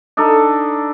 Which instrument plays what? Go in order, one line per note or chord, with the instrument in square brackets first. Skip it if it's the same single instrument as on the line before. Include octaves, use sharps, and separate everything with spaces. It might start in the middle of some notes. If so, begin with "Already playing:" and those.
[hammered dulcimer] D4 D#4 A4